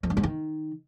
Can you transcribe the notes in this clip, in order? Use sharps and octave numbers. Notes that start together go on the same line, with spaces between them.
F2
G2
G#2
D#3